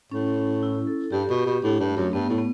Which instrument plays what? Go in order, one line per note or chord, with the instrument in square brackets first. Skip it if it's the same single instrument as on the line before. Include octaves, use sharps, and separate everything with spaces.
[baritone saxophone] A2 [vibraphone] C#4
[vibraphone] C#4
E4
A4
[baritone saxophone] G2 [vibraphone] G4
[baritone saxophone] B2
[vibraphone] G4
[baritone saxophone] B2
[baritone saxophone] A2 [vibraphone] D4
[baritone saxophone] G2
[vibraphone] A3
[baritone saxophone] F#2
[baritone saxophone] G2 [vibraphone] B3
[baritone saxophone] A2
[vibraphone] B3